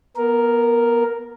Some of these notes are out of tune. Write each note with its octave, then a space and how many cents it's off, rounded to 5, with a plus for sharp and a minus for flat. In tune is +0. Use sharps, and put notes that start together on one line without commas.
B3 -25 A#4 +0